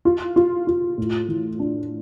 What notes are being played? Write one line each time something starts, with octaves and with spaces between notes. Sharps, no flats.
F4
F4
F4
A2
E3
D4